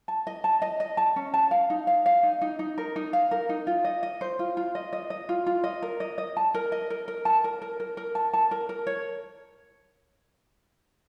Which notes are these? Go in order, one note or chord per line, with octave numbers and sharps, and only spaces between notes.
A5
D#5
A5
D#5
D#5
A5
C#4
A5
F5
D#4
F5
F5
D#4
D#4
D#4
A#4
D#4
F5
A#4
D#4
F4
D#5
D#5
C5
F4
F4
D#5
D#5
D#5
F4
F4
D#5
A#4
D#5
D#5
A5
A#4
D#5
A#4
A#4
A5
A#4
A#4
A#4
A#4
A5
A5
A#4
A#4
C#5